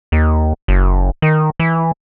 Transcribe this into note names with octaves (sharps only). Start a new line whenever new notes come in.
D#2
F#1
D#3
E3